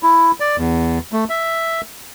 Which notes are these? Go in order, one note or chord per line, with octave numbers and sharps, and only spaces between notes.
E4
D5
E2
A3
E5